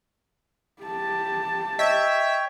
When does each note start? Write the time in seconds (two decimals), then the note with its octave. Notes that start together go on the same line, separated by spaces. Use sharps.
0.82 G4 A5
1.79 C#5 D#5 E5 G5